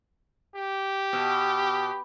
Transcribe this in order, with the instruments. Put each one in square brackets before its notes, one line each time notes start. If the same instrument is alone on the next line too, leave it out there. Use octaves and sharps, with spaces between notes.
[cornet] G4
[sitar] B2